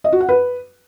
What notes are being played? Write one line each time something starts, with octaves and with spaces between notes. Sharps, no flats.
D#5
F#4
F#5
B4